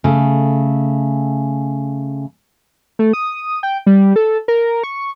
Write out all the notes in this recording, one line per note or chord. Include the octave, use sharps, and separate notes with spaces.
C#3 A3
A3
D#6
G5
G3
A4
A#4
C#6